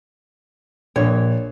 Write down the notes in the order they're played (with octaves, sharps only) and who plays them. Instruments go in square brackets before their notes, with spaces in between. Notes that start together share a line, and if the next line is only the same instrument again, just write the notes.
[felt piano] A#1 [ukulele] C#5